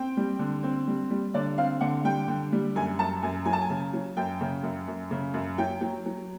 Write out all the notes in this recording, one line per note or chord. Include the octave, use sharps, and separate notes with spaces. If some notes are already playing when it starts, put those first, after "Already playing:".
Already playing: C4 G5
G3
D3
C4
G3
G3
D3 D5
C4 F5
D3 F#5
G3 G5
D3
G3
F#2 G#5
F#2 A5
F#2 G#5
F#3 G#5
A5
G#5
C#3
F#3
F#2 G5
C#3
F#2
F#2
C#3
F#2
F#3 G5
F#3
F#3